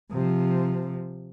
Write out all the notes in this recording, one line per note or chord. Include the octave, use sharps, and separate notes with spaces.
C3 F3